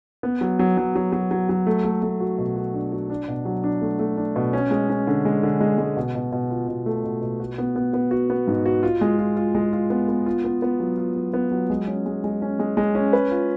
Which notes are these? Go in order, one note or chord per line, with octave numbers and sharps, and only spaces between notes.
B3
F#3
F#3
F#3
F#3
F#3
F#3
F#3
A3
A3
A3
F#4
B2
F#4
D4
F#4
D4
B2
F#3
D4
A3
A3
D4
B2
C#4
G#3
C#4
D3
G#3
D3
G#3
G#3
B2
B2
B2
F4
B2
A3
B2
B2
F#4
B3
B3
B3
F#4
B3
G#2
F#4
F4
G#3
F4
F4
G#3
F4
B3
B3
F4
B3
B3
F#3
F4
F#3
B3
F#3
G#3
C#4
G#3
G#3
C#4
G#3
G#3
C#4
B4
F4